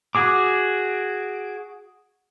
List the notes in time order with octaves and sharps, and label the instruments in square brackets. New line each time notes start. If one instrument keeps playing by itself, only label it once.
[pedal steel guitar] F#4 G#4 D6